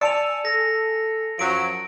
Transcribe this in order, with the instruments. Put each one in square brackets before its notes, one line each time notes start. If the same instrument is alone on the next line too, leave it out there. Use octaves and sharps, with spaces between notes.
[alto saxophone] D5 [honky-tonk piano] G#5 A5 E6 [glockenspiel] C#7 F7
[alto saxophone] A4 [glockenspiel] A#6
[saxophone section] F#2 F3 F#3 [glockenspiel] D7